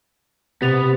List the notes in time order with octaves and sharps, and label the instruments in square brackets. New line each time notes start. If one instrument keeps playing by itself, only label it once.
[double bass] C3 [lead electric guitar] B3 [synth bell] G4 A6 F7